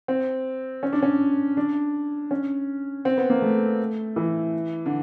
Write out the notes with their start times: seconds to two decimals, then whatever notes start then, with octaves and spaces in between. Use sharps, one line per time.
0.08 C4
0.83 C#4
0.92 D4
1.02 C#4
1.57 D4
2.31 C#4
3.05 C4
3.17 B3
3.30 A#3
3.42 A3
4.16 E3
4.86 D3